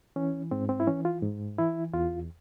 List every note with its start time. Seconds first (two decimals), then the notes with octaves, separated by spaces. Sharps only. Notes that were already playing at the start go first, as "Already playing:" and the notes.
0.16 E3 C#4
0.51 G#2 C4
0.69 C4
0.80 E4
0.87 E3 C#4
1.05 F4
1.22 G#2
1.58 E3 E4
1.93 E2 F4